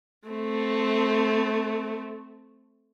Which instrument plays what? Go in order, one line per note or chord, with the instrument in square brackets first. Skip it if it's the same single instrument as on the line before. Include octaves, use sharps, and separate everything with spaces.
[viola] A3 C4